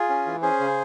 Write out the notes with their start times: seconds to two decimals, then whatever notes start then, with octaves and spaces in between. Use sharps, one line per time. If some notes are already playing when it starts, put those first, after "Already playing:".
Already playing: F4 G#4
0.09 C#4
0.26 E3
0.42 C#4 G#4 C5
0.60 C#3